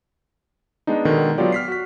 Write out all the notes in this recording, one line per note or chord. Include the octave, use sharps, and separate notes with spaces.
G#3 B3 D4 D#4
B2 D3 D#3 G#3
F#3 B3 F4 G4 D5
F6 B6 C7
F#4 B6